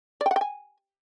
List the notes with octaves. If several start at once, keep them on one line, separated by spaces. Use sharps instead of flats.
D5
G5
F#5
G5
G#5